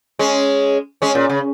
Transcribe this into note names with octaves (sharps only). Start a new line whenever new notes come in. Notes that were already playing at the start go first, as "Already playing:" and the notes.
G#3 C#4
G#3 C#4
A#2
C#3